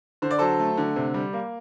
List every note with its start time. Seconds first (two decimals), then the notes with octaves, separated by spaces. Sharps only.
0.22 D3 C5
0.31 D5
0.39 F#3 A4 C5
0.60 A3
0.78 D3
0.96 C3
1.14 G3
1.33 A#3